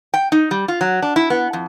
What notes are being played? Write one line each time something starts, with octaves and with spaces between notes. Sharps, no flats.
G5
D#4
G3
F4
F#3
D4
E4
B3
F2